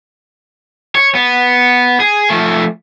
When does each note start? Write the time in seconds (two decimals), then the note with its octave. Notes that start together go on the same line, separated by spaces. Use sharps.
0.95 C#5
1.15 B3
2.00 G#4
2.30 F3 A3